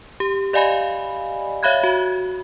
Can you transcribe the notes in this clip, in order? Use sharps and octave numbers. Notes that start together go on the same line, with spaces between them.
G4
G4 D5 D#5 F5 G#5 B5
C#5 E5 F5 B5 F#6 G#6
F#4